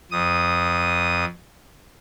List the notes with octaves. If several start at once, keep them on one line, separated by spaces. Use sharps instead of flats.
F2 D#6